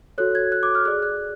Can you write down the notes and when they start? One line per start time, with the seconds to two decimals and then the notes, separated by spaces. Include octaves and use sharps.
0.18 F#4 A4 C#5 F#6
0.35 G#6
0.52 F#6
0.63 D6
0.75 F6
0.85 G#4 D5 F#6
1.02 F#6